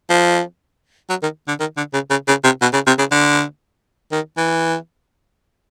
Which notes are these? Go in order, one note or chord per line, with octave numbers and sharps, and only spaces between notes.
F3
F#3
D#3
D3
D#3
D3
C#3
C#3
C#3
C3
B2
C#3
C3
C#3
D3
D#3
E3